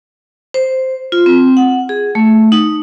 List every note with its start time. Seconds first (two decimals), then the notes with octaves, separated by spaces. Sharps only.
0.54 C5
1.12 F4
1.26 C4
1.57 F#5
1.89 G#4
2.15 A3
2.52 D#4